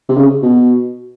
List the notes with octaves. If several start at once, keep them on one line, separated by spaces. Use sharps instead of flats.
C3
C#3
B2